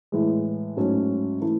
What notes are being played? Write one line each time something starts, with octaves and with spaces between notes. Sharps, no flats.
A2 E3 G#3
G#2 F#3 A3 C#4
E3 A3 E4